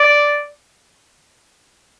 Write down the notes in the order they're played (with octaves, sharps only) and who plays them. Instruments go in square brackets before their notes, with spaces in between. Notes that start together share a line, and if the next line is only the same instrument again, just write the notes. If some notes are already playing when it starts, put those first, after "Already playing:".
Already playing: [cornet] D5